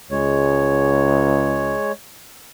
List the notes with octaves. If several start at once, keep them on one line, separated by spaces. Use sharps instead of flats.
C#2 G#3 C#5